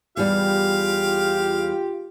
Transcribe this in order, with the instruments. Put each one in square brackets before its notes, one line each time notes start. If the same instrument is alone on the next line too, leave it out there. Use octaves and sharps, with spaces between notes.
[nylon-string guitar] E2 G3 [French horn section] F4 G4 [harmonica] F5